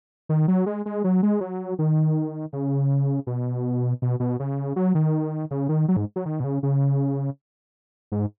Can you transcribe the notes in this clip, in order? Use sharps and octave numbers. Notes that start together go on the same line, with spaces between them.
D#3
F#3
G#3
G#3
F#3
G#3
F#3
D#3
C#3
B2
B2
B2
C#3
F#3
D#3
C#3
D#3
F#3
G#2
F#3
D#3
B2
C#3
C#3
G#2